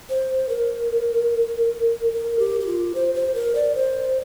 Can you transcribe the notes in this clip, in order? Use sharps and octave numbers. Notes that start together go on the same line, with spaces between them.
C5
A#4
A#4
G4
G4
F4
C5
C5
A#4
D5
C5